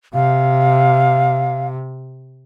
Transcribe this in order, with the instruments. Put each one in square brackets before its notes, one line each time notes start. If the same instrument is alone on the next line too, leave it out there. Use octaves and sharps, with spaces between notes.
[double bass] C3 [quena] F5